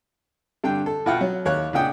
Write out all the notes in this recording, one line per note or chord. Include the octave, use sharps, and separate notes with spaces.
G2 D3 G5
A4
B2 F4 F#5 G5 F6
F#3
D#2 C#5 F#6
C#2 A#2 D4 F#5 G5 D#6